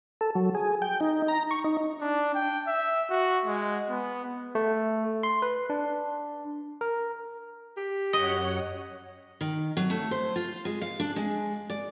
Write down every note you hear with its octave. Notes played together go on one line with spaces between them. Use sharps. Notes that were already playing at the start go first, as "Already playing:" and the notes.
A4
F#3
G#4
G5
D#4
A#5
C#6
D#4
D4
G5
E5
F#4
G#3
B3
A3
C6
B4
D4
A#4
G4
F#2 C#5 D#5 F#5
D#3
F#3
A3
C5
F4
G#3
F5
D4
G#3
D5